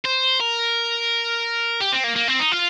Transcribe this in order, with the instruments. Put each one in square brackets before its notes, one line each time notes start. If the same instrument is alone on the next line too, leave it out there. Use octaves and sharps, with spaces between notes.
[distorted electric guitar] C5
A#4
G4
C4
A#3
A#3
C4
D#4
F4